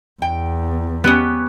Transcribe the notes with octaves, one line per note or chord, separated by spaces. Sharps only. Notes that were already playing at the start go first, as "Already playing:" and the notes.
E2 G5
B3 C#4 G4 B4